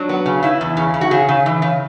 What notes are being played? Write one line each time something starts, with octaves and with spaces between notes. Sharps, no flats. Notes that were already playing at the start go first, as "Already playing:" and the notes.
Already playing: F#3 D4
B3
C#3
C#3 E4
E2
C#3
C#3
F#4
C#3 G#4
C#3
E3
C#3